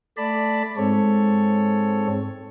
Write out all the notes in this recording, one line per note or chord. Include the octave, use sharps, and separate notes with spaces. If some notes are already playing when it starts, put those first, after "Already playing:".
A3 D5 A5 B5
G#2 G#3 C4 A4 C#5